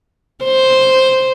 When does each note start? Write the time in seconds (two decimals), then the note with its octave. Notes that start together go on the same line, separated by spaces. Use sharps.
0.44 C5